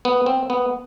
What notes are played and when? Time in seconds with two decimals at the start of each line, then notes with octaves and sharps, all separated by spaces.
0.05 B3
0.26 C4
0.50 B3